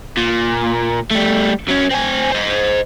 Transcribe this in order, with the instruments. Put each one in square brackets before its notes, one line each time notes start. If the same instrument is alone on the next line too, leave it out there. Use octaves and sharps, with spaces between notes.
[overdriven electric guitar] A#2
G3 A3
F#3 C#4
C4 G#5
C5 D#5